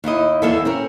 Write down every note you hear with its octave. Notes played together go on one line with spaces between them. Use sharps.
D#2 D#4 E4 D#5
E2 A#3 A4 E5
C4 C#4 A#4